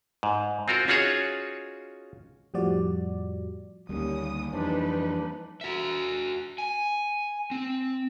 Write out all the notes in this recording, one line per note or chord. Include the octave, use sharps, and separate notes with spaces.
G#2
C4 F4 F#4 A#4 C5
C#4 D#4 F4 F#4 G#4 C#5
F2 A2 F3 G3 F#4 D5
D2 D#3 G3 A#3 C#4 D#6
F2 E3 D4 D#4 B4 C5
F#4 E5
G#5
C4